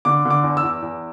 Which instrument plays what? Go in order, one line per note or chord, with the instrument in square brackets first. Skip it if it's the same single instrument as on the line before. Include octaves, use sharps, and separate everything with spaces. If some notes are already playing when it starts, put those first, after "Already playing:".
[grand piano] D3 D6
D3
D6
E2
E6
E2
E2